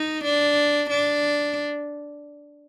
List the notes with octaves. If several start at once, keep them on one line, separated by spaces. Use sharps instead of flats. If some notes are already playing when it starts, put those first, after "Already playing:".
Already playing: D#4
D4
D4